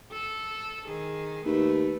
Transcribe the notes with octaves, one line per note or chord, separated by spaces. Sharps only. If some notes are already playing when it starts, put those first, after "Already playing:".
A4
D#3 G#4
D#2 A3 B4